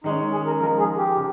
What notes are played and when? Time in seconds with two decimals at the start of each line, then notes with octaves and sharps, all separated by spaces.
0.04 D#3 G#3 C#4 D#4
0.31 G#4
0.47 A#4
0.60 F3 G#3 D#4 A#4
0.79 G#4
0.97 G4
1.17 C#3